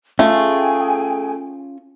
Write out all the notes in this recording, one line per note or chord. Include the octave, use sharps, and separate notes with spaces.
A3 C#4 F4 G#4 C#5 G5 G#5